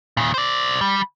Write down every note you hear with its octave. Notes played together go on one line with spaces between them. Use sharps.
A#2 D#3
C5 D5
G3